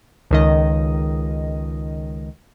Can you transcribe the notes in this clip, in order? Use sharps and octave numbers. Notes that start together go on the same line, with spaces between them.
C#2 D#3 D#5